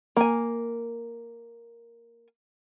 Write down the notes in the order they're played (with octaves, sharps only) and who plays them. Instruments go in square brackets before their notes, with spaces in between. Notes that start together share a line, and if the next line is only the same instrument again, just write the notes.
[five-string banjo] A#3 G#5